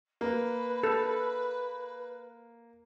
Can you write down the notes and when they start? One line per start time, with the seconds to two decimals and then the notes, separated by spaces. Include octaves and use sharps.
0.21 A#3 B4
0.83 A4